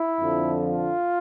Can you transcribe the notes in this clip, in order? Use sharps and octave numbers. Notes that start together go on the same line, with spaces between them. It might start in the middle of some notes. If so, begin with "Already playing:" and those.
Already playing: E4
F2 D3 F3
F4